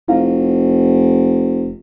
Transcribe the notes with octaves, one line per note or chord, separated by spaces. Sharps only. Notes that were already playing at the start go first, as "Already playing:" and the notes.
F1 E4 F5